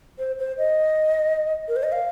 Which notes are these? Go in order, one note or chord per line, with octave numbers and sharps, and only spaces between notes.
C5
C5
D#5
A#4
C5
D#5
F5